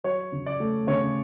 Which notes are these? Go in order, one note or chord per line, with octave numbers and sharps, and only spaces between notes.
F#3 C#5
C#3
D5
A3
C#3 C#5